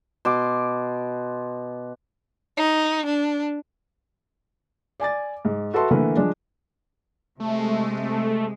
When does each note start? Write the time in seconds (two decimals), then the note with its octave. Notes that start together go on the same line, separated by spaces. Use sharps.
0.25 B2 C6 D6
2.57 D#4
3.06 D4
5.00 D5 G#5 D6 A6
5.45 G#2
5.74 F#4 A4 B4 E5 A5 C6
5.91 D3 E3 A3 A#3 A#4 B4
6.17 F3 G#3 D4
7.40 C3 G#3 A3